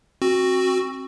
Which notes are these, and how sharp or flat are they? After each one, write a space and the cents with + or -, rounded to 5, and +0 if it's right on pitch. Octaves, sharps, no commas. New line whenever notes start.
C4 +30 F#4 +0